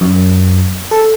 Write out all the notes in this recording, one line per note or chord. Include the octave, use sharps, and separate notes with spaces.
F#2
A4